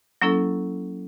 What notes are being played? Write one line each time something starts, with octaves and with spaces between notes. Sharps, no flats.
F#3 A#3 C#4 E4 A4